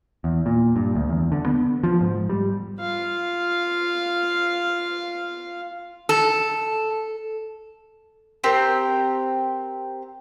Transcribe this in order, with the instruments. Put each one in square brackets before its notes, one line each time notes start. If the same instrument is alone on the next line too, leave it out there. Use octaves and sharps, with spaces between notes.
[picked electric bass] E2
A#2
G2
D2
E2
D3
B3
F3
G#2
G3
[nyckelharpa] F4 F5
[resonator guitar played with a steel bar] A4
[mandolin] C4 G4 A#4